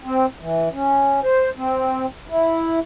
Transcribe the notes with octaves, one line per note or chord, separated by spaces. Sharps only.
C4
E3
C#4
C5
C4
E4